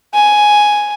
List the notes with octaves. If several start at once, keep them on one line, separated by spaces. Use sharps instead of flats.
G#5